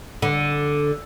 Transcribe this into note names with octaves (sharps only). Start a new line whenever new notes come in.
D3